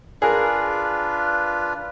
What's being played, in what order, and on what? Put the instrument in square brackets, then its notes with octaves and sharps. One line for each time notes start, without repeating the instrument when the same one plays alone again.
[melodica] D4 F4 B4 [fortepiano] G#4 A#4